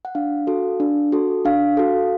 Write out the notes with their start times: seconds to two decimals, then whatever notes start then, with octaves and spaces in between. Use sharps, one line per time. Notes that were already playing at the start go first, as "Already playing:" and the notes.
0.05 F#5
0.15 D4 F5
0.47 F#4 A4
0.80 D4
1.12 F#4 A4
1.45 D4 F5
1.77 F#4 A4